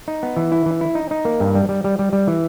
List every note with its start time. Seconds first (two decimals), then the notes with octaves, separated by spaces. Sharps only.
0.08 D#4
0.23 B3
0.37 E3
0.52 E4
0.66 E3
0.81 E4
0.95 D#4
1.11 D#4
1.25 A#3
1.40 G2
1.55 G3
1.69 G3
1.84 G3
1.99 G3
2.13 G3
2.27 E3